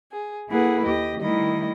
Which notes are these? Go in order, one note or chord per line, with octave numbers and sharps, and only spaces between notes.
G#4
A#3 E4 G#4 A4 B4 F#5
D#2 G4 D#5
D#3 G3 A3 E4 D#5